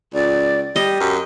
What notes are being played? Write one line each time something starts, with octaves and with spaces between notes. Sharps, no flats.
C#2 D5
G3 G4 D#5
F#2